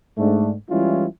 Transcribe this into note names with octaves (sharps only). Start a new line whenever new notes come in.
G#2 A3 D4
E3 G3 G#3 C#4 E4 F4